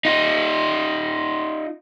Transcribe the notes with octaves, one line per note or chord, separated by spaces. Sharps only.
D#4 F4